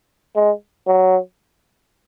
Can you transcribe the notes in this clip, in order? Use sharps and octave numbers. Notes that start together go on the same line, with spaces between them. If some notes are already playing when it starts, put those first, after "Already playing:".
G#3
F#3